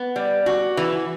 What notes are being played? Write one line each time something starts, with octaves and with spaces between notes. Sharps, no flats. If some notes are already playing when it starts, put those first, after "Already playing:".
Already playing: B3
G3
F#4
E3